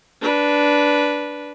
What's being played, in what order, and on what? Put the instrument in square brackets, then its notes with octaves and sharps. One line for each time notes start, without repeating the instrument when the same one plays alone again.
[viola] D4 B4